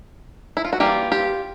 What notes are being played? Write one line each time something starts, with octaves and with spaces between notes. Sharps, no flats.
E4
F4
F#4
E3 G3 A#3 F4 G4
F4 G4